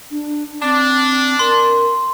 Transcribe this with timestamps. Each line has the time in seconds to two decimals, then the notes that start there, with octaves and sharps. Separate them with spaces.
0.11 D4
0.62 C4 D4
1.39 A#4 C6